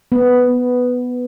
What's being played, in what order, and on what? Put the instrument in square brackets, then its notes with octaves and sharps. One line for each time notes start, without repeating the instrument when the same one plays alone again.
[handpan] B3